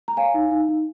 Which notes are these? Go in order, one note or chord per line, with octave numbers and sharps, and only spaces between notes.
A#5
C#5 F5 G#5
D#4
D#4
D#4